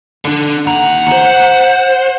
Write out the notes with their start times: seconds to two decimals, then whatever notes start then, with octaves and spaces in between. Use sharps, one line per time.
0.25 D3 D4
0.67 D#2 F#5 A#5
1.12 C5